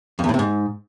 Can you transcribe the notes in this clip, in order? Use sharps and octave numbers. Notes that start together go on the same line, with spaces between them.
F2
E2
A2
C3
G#2